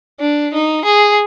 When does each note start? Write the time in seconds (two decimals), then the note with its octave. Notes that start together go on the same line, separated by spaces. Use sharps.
0.20 D4
0.54 D#4
0.85 G#4